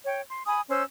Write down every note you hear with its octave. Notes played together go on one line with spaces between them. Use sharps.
C#5 G5
C6
G#5 B5 D#6
C#4 C5 C6 E6